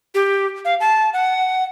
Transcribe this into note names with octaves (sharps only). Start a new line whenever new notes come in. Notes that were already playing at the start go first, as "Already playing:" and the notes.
G4
F5
A5
F#5